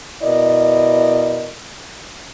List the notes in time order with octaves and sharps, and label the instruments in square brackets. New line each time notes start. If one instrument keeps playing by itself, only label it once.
[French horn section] B2 E4 A#4 D5 D#5